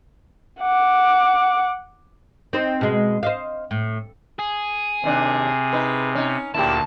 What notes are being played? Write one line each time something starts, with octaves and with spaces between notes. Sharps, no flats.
F#5 D6
C4 D#4 C5
B2 G#3
C5 D#5 F5
A2
G#4
D#2 C3 D4
D#4 B4
C#4 D#4
D2 A#2 E4 G4 A5